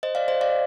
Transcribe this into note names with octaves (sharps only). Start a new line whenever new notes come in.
C5 D#5
D5 F5
C5 D#5
D5 F5